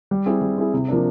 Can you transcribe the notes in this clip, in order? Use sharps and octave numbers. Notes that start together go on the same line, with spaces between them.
G3
C4 E4 G#4
G3
C4 E4 G#4
C3
F3 A#3 D4